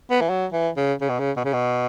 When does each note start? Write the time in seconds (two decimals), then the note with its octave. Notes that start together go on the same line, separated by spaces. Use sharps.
0.11 B3
0.21 E3
0.30 F#3
0.52 E3
0.77 C#3
1.01 C#3
1.09 B2
1.19 C#3
1.37 B2
1.45 C#3
1.53 B2